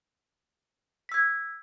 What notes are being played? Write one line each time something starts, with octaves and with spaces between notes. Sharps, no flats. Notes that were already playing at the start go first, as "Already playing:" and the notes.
E6 G#6 B6